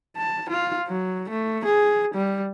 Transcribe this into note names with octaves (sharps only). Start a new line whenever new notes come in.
A5
F4
F#3
A3
G#4
G3